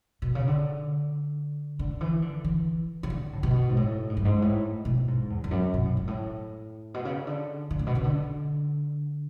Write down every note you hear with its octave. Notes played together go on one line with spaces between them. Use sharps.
B2
C#3
D3
D3
E3
D3
E3
C#3
D3
A2
B2
G#2
A2
G#2
F#2
G#2
A2
B2
G#2
E2
E2
F#2
B2
A2
G#2
A2
B2
C#3
D3
D3
A2
B2
C#3
D3